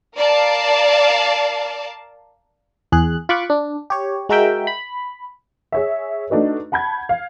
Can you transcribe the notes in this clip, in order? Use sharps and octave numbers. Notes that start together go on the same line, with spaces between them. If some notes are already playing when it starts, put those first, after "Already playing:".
A#4 D5 F5 A5
E2 G#4 F#6
F4 B5 C#6 D6 F#6
D4
G4 C#5
G#3 F#4 A#4 E5 G5
B5
G#4 C#5 E5
A3 D4 D#4 F#4 B4
F#5 A5 B5 G6 G#6
F5